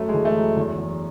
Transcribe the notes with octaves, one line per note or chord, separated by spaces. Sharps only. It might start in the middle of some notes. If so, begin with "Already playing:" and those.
Already playing: F#2 A3
G#3
E3
A3
F#2
E2
E2